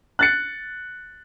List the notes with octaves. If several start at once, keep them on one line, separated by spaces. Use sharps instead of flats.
F#6 A6 C#7